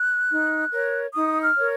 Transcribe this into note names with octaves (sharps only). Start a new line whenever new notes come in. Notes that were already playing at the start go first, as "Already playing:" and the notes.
Already playing: F#6
D#4
A#4 C#5
D#4 D#6
F6
A#4 C#5